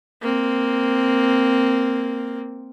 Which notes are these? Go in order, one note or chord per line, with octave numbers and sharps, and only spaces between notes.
A#3 C4